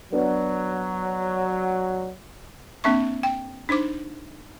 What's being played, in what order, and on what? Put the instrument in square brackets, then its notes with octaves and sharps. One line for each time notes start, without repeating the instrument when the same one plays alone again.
[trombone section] F#3 [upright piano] B3 D4
[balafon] A#3 C4 D4 E5 C#6
G5
D4 D#4 C5 D6